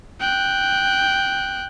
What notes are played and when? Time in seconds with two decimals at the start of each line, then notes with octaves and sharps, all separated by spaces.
0.20 G5 F#6